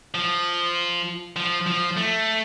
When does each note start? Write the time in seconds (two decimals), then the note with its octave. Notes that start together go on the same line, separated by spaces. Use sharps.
0.15 F3
1.36 F3
1.67 F3
1.97 A3